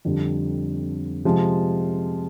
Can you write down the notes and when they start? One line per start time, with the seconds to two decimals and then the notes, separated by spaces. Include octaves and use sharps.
0.05 F2 D3 G3
1.25 C3 F3 G#3